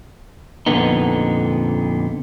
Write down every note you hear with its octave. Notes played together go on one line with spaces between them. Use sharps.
F2 A#2 D3 B3 D#4